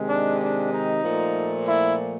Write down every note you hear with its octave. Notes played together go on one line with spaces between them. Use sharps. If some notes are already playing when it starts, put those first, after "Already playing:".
Already playing: C3 D#3 G#3
D4
D4
D#4
A#2 F3 A3
E4